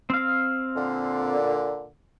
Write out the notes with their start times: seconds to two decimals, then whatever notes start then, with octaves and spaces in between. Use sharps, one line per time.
0.10 C4 F5
0.75 A#2 D3